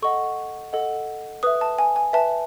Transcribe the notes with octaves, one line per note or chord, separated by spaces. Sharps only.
A4 D#5 F#5 C#6
A4 D#5 F#5
B4 E5 D#6
A5
G#5
G#5
B4 E5 A5